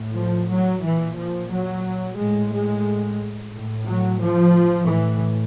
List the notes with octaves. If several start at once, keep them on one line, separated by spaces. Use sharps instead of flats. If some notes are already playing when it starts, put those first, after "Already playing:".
Already playing: A2
F3
F#3
A#2 E3
F3
F#3
A2 G#3
G#3
A2
F#3
F3
A2 E3